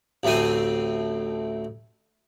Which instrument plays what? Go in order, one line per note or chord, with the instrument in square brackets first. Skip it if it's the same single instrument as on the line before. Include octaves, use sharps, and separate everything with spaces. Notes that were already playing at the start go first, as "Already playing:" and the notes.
[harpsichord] A1 D2 A3 C4 G#5